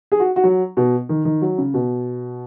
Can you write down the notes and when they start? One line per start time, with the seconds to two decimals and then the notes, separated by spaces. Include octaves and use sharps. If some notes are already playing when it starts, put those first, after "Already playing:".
0.12 G#4
0.20 F#4
0.36 F#4
0.44 F#3
0.77 B2
1.09 D#3
1.25 D#3
1.42 F#3
1.58 C#3
1.74 B2